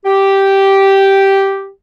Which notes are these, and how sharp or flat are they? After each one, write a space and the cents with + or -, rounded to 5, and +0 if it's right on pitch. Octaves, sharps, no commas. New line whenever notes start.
G4 -5